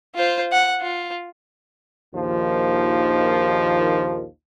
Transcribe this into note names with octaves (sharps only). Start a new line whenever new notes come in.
F4 C5
F#5
F4
A#1 D#2 D#3 F3